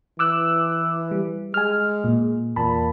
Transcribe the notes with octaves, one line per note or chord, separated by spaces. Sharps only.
E3 D6 E6 F#6
G3
G#3 G#5 F6
A#2
E2 A#2 A5 B5